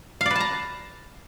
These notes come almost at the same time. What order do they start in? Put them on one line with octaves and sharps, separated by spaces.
F5 D5 B4 A5 A#5